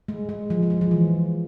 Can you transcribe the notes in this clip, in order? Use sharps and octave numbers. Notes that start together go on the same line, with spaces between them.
G#3
G#3
F3
G#3
F3
F3
E3